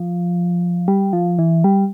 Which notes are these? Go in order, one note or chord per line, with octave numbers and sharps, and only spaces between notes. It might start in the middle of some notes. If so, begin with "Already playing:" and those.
Already playing: F3
G3
F3
E3
G3